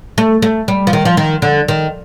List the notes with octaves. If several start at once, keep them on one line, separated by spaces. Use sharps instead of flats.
A3
A3
G3
F3
D#3
F3
D#3
D3
D#3